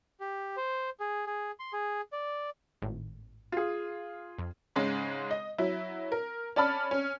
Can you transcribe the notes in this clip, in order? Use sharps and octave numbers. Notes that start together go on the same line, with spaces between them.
G4
C5
G#4
G#4
C6
G#4
D5
G#1 A2
F4 G#4
F2
G#2 C#3 G#3
D#5
F#3 E4
A#4
C#4 D5 A5 B5 F6
C#4